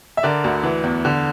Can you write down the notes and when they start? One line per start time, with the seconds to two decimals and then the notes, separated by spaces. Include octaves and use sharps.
0.17 E5
0.23 D3 A#4 D5
0.44 D2
0.63 E3
0.83 E2
1.05 D3